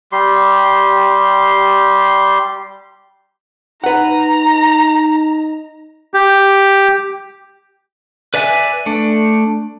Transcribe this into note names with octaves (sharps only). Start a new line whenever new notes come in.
G3 G4 C6
D#4 B4 F#5 A#5
G4
B4 D5 E5 G#5 F#6
A3 D4